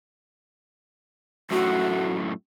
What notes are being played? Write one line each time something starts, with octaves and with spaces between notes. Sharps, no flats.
F#2 A2 A3 F#4